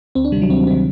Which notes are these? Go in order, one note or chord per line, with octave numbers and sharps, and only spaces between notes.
D2 C4
D4
C3 D#3 G3
F#3
D2 C4
C3 D#3 C4